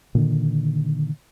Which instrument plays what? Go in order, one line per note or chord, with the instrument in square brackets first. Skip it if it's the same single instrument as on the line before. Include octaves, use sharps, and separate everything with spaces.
[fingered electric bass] A#2 D3 D#3